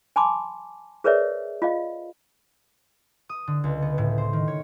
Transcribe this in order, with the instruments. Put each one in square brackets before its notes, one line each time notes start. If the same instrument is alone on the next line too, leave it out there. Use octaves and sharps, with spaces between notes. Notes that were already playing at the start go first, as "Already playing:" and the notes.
[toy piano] G#5 A5 B5 C6 D6
G#4 A#4 B4 C#5 D5 E5
F4 D#5 F5
[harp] D#6
D3
C#2
B3
A2
C5
D#3
C#5